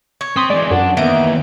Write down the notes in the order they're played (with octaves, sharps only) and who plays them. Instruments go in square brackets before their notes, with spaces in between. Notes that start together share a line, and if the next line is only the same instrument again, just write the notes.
[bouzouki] C#5
[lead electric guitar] C4 [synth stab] C6 D#6 B6
[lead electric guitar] E3 G#3 [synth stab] D5
[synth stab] F#2 [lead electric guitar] D4 [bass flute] F#5
[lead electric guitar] D#2 [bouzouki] E3 [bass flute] B3 [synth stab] D#6 D7